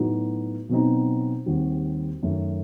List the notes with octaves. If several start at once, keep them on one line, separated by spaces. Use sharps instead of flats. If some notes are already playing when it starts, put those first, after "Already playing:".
Already playing: A2 F#3 B3 D#4 F#4
B2 F#3 C4 D#4
D#2 D#3 G3 C4 F#4
F#2 D#3 A3